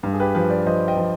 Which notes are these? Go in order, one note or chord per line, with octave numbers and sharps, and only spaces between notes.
G2
G#4
G4 B4
F3 G4 B4
B4 D5
F3 C5 D#5
D#5 G5
F3